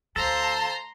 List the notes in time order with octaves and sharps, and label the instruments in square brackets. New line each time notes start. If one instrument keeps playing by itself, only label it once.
[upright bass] D2 [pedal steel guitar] A4 [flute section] C5 F5 A5 [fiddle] A#5 C6